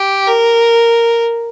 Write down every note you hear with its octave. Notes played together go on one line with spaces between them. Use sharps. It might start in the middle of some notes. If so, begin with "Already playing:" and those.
Already playing: G4
A#4